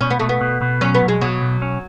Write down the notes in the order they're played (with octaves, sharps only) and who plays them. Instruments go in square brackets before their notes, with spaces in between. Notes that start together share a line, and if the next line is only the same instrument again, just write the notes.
[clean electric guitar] B2 [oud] C#4
[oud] B3
[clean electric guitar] B2 [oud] A3
[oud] B3
[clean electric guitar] B2
B2
[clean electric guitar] F#3 [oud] C#4
[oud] B3
[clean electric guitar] B1
[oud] G#3
[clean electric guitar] B2 [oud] F#3
[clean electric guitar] B1
C#4